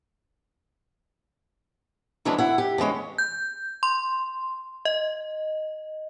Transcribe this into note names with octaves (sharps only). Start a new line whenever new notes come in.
D#3 E3 F#3 G#3 C#4 D4
E4 F#5
G4
D3 E3 G#3 C#4
G6
C6
D#5